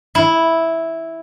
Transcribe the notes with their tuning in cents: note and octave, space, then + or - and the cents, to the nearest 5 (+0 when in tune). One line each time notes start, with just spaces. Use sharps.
E4 -5